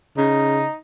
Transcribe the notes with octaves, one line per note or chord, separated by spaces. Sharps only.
C#3 D#4